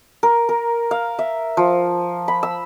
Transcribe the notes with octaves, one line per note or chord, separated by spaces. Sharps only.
A#4
A#4
F5
E5
F3
B5
E6